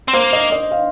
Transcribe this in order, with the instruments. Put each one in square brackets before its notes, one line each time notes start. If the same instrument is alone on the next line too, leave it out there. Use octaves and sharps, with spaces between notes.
[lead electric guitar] C4
[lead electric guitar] A#3 [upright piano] C5
[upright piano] D#5
D#5
F5